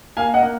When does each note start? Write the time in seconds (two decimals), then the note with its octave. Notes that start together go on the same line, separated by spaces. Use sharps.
0.17 A#3 F5 G#5
0.34 D#5 F#5
0.43 A#3